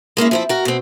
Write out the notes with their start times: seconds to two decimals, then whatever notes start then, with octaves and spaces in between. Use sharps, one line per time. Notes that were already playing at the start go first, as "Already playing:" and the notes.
0.17 G#3 A#3 C#4 E4
0.31 F3 C4 E4
0.49 F#4 A#4
0.65 B2 C4